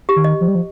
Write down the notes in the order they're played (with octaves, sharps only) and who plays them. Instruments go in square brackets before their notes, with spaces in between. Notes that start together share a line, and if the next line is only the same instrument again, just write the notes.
[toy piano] G4
[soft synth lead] D#3
[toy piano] D#5
[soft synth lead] F3
G3
F3